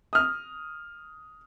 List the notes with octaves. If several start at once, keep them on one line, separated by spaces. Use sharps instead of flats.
D#6 F6